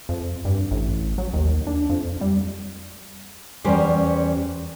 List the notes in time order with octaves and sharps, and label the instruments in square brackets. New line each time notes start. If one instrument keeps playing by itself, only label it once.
[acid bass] F2
G2
A1
F#3
D#2
D4
F2
G3
[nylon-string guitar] E2 G3 C#4 G4 A#4 C5